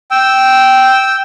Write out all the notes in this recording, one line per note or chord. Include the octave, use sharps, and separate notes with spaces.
G5 E6